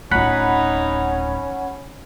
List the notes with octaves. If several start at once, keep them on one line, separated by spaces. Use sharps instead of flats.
D1 C#4 D#4 F4 F#5 B5